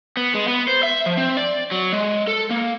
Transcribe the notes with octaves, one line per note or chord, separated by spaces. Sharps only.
B3
G#3
B3
C5
E5
F3
C4
D5
F#3
G#3
A4
A#3